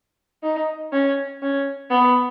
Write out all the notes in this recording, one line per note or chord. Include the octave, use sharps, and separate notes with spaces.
D#4
C#4
C#4
B3